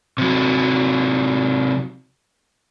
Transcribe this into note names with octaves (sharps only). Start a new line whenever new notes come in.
C3 F#3